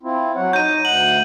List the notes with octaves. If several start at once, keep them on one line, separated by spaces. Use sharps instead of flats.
C4 E4 F4
F#3 C#5 F#5
D#4 A#5 G6 D#7
D2 F#5 F#7